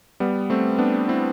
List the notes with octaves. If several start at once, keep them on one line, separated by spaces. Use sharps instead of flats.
G3 B3
A3 C4
B3 D4
C4 E4